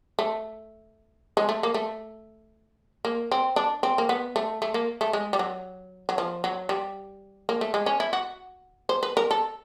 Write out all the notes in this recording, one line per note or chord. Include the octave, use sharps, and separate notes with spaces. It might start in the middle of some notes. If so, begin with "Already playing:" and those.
A3
G#3
A3
A#3
A3
A#3
C4
D4
C4
A#3
B3
A3
A3
A#3
A3
G#3
G3
F#3
F#3
F3
F#3
G3
A#3
A3
G#3
C#4
E4
F#4
C5
B4
A#4
A4